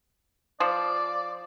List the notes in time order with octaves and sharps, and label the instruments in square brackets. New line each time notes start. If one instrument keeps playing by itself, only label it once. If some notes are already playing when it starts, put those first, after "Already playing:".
[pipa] F3 [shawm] D5